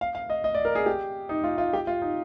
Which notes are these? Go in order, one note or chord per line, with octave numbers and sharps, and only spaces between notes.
F5
F5
D#5
D#5
D5
A#4
G#4
G4
D#4
F4
F4
G4
F4
D#4